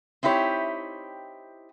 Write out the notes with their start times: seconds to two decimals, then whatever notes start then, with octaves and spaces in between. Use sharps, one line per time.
0.23 C4 D#4 E4 G4 C#5